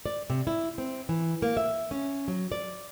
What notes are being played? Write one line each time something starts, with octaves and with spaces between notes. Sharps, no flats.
D5
C3
E4
C4
E3
A#3
E5
C#4
F#3
D5